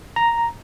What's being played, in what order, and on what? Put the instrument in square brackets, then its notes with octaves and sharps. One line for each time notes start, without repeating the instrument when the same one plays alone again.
[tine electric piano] A#5